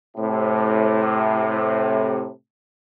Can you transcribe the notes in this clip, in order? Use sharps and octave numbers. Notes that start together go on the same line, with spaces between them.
A2 C3